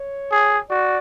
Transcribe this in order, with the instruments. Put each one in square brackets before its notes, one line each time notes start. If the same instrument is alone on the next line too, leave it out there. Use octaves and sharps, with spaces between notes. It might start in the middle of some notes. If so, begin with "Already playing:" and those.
Already playing: [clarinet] C#5
[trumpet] G#4
[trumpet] F#4 [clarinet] D5